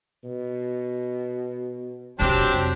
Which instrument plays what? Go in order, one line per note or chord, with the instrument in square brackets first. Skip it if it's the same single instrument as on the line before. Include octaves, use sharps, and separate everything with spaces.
[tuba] B2
[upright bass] F2 C3 [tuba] F#3 [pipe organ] C4 G4 [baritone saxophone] D4